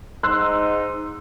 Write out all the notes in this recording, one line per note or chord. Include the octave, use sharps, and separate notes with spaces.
G#2 D#4 C6 E6 F#6